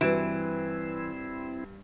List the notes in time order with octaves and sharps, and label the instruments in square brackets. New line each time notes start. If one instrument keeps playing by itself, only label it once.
[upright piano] G2 D7 E7 [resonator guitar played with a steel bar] E3 [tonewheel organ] C4 E4 [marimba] F#4 B4